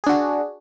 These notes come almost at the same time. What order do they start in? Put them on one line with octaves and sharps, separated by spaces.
G#4 D4 F#4